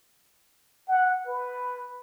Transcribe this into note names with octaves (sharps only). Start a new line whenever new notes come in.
F#5
B4